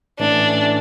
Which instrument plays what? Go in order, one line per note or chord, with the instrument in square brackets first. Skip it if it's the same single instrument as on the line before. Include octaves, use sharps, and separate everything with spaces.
[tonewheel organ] A2 E3 A3 C#4 [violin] D4